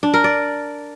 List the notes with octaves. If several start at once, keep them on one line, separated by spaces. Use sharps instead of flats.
D4
A#4
D5